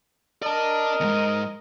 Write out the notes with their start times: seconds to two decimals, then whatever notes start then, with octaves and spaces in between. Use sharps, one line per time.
0.42 A#4 D5 D#5 A5
1.00 E2 G#2